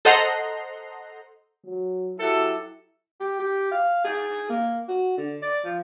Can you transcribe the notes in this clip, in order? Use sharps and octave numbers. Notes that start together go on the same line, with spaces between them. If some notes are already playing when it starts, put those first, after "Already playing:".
A4 C5 D#5 F#5 A#5 C6
F#3
F#3 E4 G4 A4
G4
G4
F5
G#4
A#3
F#4
D3
D5
F3